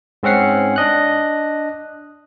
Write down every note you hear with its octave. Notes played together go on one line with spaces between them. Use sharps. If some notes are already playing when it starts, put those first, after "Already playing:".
G#2 C4 C#4 F#5 C7
D4 D#5 F#6